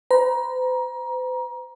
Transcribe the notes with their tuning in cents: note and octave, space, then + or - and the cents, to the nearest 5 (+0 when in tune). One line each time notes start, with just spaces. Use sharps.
C5 -45 A#5 +25